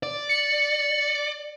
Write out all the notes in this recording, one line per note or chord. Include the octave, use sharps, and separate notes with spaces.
D5
C#7